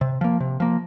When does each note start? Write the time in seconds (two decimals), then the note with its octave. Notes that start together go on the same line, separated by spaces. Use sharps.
0.01 C3
0.21 F3 A#3
0.40 C3
0.60 F3 A#3